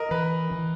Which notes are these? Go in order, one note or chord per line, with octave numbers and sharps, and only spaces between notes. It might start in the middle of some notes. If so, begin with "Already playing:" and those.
Already playing: A#4 D#5
E3 B4
E3